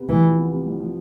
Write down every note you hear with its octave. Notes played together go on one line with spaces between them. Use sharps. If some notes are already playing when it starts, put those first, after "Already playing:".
Already playing: C3 B3
C2 E3
F3
B3
C3
C2
F3